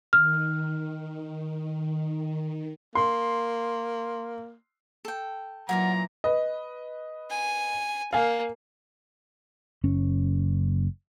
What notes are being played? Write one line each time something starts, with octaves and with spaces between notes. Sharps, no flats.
D#3 F6
A#3 C6
A4 G5
A#2 E3 F#3 F#4 A#4 D5 A#5
B4 D#5
G#5
A#3 F5 G#5
F#1 C#4